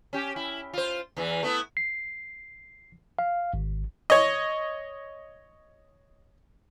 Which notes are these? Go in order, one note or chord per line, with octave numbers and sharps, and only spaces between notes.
C#4 G4
E4
F4 C5
E2 E3
A3 B3 E4
C7
F5
G#1
C#5 D#5